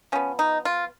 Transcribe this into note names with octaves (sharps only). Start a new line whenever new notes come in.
F3 B3 C#4
D#4
F4